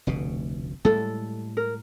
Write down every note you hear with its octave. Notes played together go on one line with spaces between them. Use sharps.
F1 D2 B2
A2 G3 G#3 A4
A#4